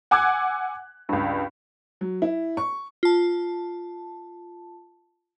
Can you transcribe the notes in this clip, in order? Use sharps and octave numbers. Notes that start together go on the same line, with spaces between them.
F#5 G#5 D6 E6 F#6 G#6
C#2 G2
F#3
E4
C#6
F4 A5